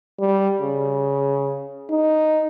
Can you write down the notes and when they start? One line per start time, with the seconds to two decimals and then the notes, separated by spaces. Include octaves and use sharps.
0.20 G3
0.61 C#3
1.91 D#4